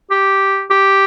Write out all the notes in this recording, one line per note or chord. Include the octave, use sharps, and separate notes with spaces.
G4
G4